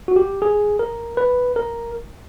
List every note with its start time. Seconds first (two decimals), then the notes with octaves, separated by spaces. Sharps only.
0.08 F#4
0.16 G4
0.42 G#4
0.79 A#4
1.17 B4
1.56 A#4